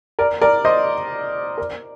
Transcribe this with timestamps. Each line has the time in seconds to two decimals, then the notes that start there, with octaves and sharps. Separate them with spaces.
0.19 A#4 D5
0.41 A#4 D5
0.65 C5 D#5
1.58 A#4 D5